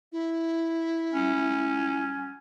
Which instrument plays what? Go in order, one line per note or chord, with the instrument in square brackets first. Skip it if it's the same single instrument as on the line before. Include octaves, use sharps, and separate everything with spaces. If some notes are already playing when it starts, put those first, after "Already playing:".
[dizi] E4
[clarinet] C#4